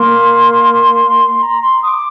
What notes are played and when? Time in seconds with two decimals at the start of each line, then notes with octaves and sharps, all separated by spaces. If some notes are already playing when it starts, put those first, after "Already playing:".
Already playing: A#3 C6
1.42 A#5
1.62 C6
1.82 D#6
1.87 D6